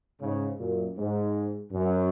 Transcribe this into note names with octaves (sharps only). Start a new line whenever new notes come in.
G#2 C#3
F#2 A#2
G#2
F#2